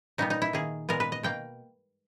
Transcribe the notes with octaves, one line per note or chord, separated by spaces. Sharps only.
A#2 G3 B3 D#4
D#4
E4
D#3 A#3 G#4
A#2 G#3 B3 A#4
B4
D#5
B2 A#3 G5